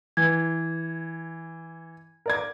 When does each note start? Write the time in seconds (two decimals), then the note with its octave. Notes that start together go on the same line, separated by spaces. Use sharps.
0.17 E3 G#6
2.26 A#4 D5 G#6